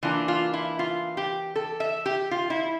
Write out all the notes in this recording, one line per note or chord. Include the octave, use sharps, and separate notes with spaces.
E3 A#3 D4 F4
F4
E4
F4
G4
A4
E5
G4
F4
E4